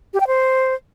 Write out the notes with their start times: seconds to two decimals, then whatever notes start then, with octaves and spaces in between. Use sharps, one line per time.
0.14 G4
0.20 G5
0.27 C5